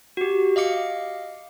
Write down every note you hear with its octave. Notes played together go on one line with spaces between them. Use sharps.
F#4 G4
D#5 F5 D6 C#7